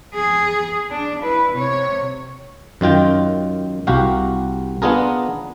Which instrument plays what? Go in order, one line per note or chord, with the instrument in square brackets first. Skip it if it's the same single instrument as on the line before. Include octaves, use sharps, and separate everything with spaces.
[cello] G#4
D4
E4 B4
C3 C#5
[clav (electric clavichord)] F#2 D#3 F4 G5
C2 F#4 G4 F5
B3 D4 F4 G#4 A#4